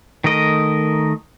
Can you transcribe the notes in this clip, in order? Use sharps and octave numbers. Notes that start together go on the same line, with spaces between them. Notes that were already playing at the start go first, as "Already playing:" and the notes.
D#3 A3 A#4 D#5